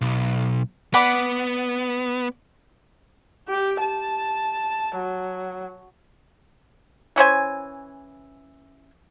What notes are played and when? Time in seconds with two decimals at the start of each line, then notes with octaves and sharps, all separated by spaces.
0.01 B1
0.94 B3 D5 F#5 B5
3.49 G4
3.81 A5
4.96 F#3
7.16 E3 C#4 C5 G#5